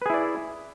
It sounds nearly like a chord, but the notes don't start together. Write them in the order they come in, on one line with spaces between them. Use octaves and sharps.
B4 G#4 E4 D5